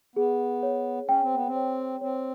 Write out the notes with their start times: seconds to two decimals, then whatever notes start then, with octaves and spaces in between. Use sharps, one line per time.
0.16 B3 G#4
0.63 C#5
1.08 C#4 G5
1.22 C4
1.35 B3
1.47 C4
1.55 C#5
2.01 C4 C#5